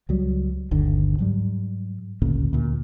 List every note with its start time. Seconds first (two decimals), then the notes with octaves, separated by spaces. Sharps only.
0.09 C#2 F#3 G3
0.71 G1 D#2 D3
1.19 G#2 F#3 G3
2.22 G#1 D2 A#2 C#3
2.53 D2 A#2